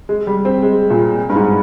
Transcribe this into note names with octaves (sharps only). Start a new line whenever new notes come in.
G#3
G3
C4
G#3
A#2
G2
G#2